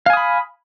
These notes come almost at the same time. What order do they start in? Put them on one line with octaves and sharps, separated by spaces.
F5 G#5 D#6 B5